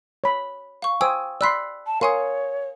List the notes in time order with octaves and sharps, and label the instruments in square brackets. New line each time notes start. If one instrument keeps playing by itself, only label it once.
[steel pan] C#5 B5
[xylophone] F5 C#6
[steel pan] C5 G#5 [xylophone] G5 D#6 E6
[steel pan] D5 B5 C6 [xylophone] E6 F#6 B6
[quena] A5
[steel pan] A#4 C6 C#6 [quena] C#5 [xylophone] F5 G#5 D#6